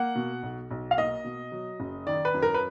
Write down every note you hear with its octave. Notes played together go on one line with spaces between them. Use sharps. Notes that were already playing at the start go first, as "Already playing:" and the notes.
Already playing: A#3 F#5
B2
B1
B1
F5
A#3 D#5
B2
F#3
F#1
D#3 D5
B4
F#2
A#4
B4